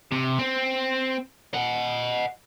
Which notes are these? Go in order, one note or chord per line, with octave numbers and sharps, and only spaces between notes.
C3
C4
D#5 F#5